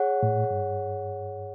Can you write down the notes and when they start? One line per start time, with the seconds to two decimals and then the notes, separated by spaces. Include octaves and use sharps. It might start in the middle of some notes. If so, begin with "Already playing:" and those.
Already playing: G#4 C#5 F#5
0.23 A2
0.51 G2